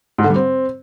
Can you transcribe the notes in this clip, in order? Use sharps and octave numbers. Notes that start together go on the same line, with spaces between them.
G#2
D3
G3
C4